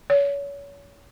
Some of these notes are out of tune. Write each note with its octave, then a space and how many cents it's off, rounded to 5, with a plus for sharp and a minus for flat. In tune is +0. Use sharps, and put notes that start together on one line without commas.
C#5 +30